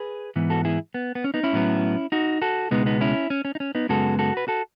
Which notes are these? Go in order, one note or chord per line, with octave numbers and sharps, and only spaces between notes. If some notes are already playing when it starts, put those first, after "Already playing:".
Already playing: G#4 B4
G#2 E3 B3
F#4 A4
E4 G#4
B3
B3
C#4
B3 D#4
C#4 E4
A2 F#3 B3
D#4 F#4
F#4 A4
C#2 B2 G#3 B3 D#4
B3 D#4
C#4 E4
C#4
C#4
D#4
C#4
B3 D#4
F#2 C#3 G#3 B3 F#4 A4
F#4 A4
B4
F#4 A4